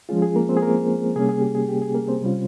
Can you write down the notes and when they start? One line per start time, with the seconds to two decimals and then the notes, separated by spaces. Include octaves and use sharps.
0.09 F3 G#3 C#4 F4 G#4
0.22 G#4
0.36 A#3 A#4
0.49 C4 C5
0.57 G#4
0.62 A#3 A#4
1.16 C3 G3 A#3 C#4 G#4
1.29 G#4
1.41 G4
1.55 G#4
1.69 G4
1.82 G#4
1.95 A#3 A#4
2.08 C4 C5
2.21 C3 G3 C#4 F4